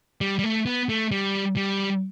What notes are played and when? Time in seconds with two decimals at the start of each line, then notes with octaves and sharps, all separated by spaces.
0.21 G3
0.39 G3
0.44 A3
0.66 B3
0.89 A3
1.12 G3
1.56 G3